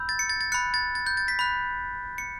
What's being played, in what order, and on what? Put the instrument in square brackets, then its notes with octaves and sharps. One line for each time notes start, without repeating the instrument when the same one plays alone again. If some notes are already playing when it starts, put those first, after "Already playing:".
Already playing: [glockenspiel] B5 E6 G6
A6
C#7
A6
A6
B5 F#6 C#7
A6
A6
G6
A6
B6
B5 F#6
C#7